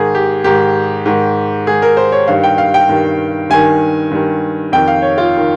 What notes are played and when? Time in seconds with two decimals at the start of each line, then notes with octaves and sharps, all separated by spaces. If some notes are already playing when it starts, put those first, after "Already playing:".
Already playing: G#2 D#3 G#4
0.15 G4
0.44 G#2 D#3 G4
1.06 G#2 D#3
1.67 G#2 D#3 G#4
1.82 A#4
1.97 C5
2.12 C#5
2.27 G2 D#3 F5
2.44 G5
2.58 F5
2.74 G5
2.89 G2 D#3
3.50 G2 D#3 G#5
4.11 G2 D#3
4.72 F2 D#3 G5
4.88 F5
5.02 C#5
5.18 F4
5.37 D#3